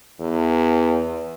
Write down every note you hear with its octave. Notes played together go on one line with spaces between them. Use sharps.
E2